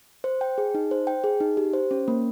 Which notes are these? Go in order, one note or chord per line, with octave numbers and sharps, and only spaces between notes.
C5
G5
G#4
D#4
C5
G5
G#4
D#4
G4
C5
C#4
A#3